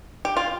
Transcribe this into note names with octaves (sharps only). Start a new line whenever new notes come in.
G4
F4